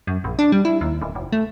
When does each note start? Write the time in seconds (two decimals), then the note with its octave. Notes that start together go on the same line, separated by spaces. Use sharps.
0.07 F#2
0.24 A#1
0.39 D4
0.52 G3
0.65 E4
0.81 D#2
1.02 D1
1.15 F1
1.32 A3